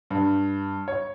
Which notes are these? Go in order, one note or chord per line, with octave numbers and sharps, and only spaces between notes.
G2
C#5